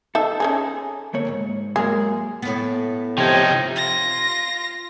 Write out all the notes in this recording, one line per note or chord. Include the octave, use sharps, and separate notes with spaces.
D#4 A4 E5
C#4 D#4 G#4
D2 A#3 C#5
C#2 G#2
F#3 G#3 A#3 G#4
A2 B3
C3 F3 D#4 G5 G#6
F4 A#6